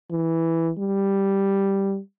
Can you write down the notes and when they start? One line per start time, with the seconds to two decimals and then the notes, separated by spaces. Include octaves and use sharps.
0.11 E3
0.78 G3